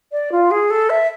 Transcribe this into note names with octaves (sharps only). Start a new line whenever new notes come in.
D5
F4
G#4
A4
E5